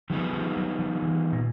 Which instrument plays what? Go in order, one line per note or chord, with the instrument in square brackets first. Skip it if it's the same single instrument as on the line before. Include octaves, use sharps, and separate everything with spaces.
[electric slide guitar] D#3 G3 B3 D#4 G#4 [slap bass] F3
[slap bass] F3
F#3
F3
E3
A#2